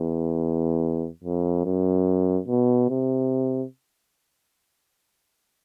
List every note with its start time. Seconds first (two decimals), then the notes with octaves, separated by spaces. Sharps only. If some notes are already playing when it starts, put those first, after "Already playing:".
Already playing: E2
1.24 F2
1.66 F#2
2.48 B2
2.90 C3